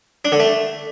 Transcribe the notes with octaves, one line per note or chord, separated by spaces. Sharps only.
D4
D3
A3